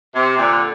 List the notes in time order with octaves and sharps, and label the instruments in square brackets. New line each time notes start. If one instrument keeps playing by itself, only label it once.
[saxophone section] C3
A#2 D3